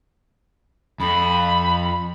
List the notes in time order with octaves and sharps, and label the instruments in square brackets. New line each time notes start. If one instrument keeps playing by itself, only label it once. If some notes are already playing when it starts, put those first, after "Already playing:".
[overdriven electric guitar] F2 [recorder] B5